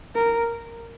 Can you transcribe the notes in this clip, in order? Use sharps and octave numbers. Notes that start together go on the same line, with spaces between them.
A#4